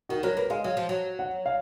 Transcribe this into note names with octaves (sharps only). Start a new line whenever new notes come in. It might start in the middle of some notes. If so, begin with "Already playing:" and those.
D#3 F#4
F#3 A#4
A#3 B4
G#3 F5
F#3 F5
F3
F#3
F#5
F5